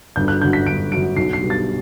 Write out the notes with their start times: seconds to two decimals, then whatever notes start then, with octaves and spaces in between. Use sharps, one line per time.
0.16 G1 G6
0.28 F#6
0.41 F#2 D3 G6
0.53 B6
0.66 G1 D7
0.91 F#2 D3 D7
1.16 B1 C7
1.33 C7
1.42 B2 G3
1.50 A6